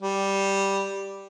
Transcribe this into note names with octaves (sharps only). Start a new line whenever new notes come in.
G3